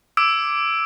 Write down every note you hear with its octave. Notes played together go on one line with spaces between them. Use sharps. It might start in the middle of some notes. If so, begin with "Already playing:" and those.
D6 E6 G#6 D7